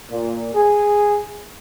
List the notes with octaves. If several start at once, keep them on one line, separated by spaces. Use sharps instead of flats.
A#2
G#4